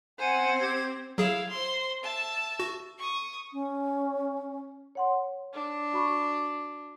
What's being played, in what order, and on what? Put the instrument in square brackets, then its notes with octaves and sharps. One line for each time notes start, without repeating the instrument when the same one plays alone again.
[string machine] C4 [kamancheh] C5 [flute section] F#5 G#5
[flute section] G4 G#6
[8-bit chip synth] F#3 G#4 [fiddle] E4 F5
[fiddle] C5 C6
E5 A5
[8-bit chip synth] F#4
[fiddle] C#6 D#6
[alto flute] C#4
[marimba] C#5 F#5 C6
[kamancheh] D4
[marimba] F#4 B5 C#6